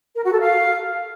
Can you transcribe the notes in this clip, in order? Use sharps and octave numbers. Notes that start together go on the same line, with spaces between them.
A#4
F#4
A4
F5